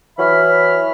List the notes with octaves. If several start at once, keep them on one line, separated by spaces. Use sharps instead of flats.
E3 F#3 E5 B5 F6